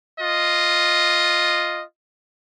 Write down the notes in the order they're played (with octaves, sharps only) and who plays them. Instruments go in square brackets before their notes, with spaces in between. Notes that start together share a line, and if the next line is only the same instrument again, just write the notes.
[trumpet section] F4 D#5